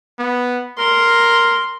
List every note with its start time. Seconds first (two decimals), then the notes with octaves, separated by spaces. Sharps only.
0.19 B3
0.79 A#4 C6